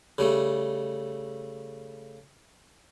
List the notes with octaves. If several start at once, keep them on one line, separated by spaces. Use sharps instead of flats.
C#3 G3 A3